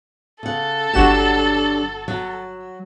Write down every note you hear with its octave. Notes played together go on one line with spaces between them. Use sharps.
C#3 A4 F#5
G1 F#3 D4 F#4 G4 E7
F#3